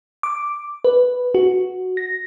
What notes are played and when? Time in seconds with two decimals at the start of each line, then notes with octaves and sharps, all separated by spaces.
0.23 D6
0.84 B4
1.35 F#4
1.97 A#6